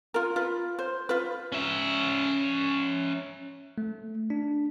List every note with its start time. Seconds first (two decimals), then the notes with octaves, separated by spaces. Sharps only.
0.14 F4 A#4
0.36 F4 B4
0.79 C5
1.09 F4 B4
1.52 C#4 E5
3.78 A3
4.30 D4